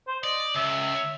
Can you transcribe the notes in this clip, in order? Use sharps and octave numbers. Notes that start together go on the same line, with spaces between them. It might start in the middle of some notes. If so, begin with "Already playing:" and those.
C5
D5 D#5
C#2 E5